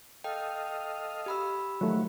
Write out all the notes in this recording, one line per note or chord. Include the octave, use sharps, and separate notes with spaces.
A4 D#5 F5 G5
G4 B5 E6
D#3 F3 F#3 A3 F#4